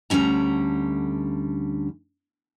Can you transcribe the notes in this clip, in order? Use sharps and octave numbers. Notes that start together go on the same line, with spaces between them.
D2 D3 G3 C#4 A#5